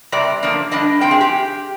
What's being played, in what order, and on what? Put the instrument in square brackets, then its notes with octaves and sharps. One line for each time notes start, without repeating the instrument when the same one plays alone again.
[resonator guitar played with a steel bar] C3 G3 C4 D5
D3 F3 A#3 D4
D3 G3 D4 D#5
C3 F3 C4 G5
G#4
G4